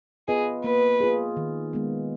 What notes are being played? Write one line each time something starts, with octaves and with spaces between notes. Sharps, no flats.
B3 F4 G#4 B4 D#5
A#3 B4
F4 G#4
D#3
G#3 B3